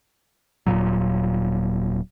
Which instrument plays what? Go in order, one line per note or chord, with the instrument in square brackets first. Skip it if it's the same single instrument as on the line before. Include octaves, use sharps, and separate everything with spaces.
[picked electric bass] D#1 G#1 A#2 F#3